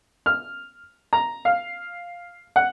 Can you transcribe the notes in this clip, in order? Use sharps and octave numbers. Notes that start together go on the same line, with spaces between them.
F6
A#5
F5
F#5